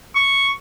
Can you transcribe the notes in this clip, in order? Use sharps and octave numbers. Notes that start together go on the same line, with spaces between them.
C#6